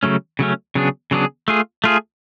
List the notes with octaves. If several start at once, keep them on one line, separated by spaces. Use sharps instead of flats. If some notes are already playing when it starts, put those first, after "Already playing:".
C#3 F#3 A3 C#4
C#3 F#3 A3 C#4
C#3 F#3 B3 D4 G#4
C#3 F#3 B3 D4 G#4
A3 F4 G#4
A3 F4 G#4